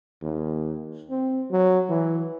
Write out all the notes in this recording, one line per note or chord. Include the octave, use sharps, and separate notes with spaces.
D#2
C4
F#3
E3